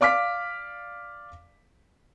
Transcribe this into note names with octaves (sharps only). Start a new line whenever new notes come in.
D5 F5 D6 F6 B6